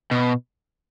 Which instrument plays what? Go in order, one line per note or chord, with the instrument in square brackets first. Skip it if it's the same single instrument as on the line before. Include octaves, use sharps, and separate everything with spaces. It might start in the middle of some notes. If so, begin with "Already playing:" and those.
[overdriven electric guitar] B2